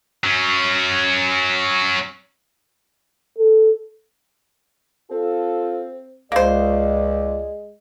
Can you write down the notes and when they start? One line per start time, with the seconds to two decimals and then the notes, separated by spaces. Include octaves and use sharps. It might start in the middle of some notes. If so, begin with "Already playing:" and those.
0.24 F#3 C#4
3.38 A4
5.11 C4 F4 A4
6.32 C#2 G#3 A#3 C5 D5